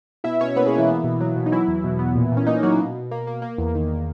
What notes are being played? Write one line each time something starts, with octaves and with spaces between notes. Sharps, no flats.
B2 E4 E5
B2 C#4 C#5
A#3 B3 B4
G#3 G#4
A#3
E3 E4
B3
B2
F#3
B2
D#4
E3 F#3 E4
E2
B2
B3
A#2
A#2
C#4
A#3 D#4
F#3 A#3 F#4
B2
B2
A#3
A#3
A#3
E2
D#3